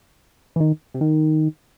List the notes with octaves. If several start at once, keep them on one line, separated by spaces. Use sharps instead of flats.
E3
D#3
C3
D#3